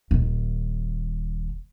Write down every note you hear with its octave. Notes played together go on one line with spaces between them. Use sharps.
D#1 D#3